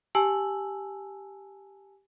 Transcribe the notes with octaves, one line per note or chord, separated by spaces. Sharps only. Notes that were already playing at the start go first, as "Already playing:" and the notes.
G4 G#5 A5 E6 F#7